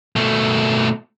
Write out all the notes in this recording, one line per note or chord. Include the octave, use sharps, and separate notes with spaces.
B2 A3